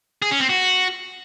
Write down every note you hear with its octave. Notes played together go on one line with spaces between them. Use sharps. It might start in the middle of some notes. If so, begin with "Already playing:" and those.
G#4
C#4
C4
F#4